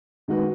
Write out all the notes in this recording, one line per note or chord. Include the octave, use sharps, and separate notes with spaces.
D#3 G#3 D#4 F#4 B4